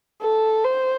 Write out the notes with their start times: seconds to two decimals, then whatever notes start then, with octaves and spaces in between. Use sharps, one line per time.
0.22 A4
0.64 C5